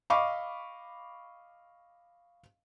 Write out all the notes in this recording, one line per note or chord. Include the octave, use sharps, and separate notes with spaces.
D#5 F5 B5 C#6 D6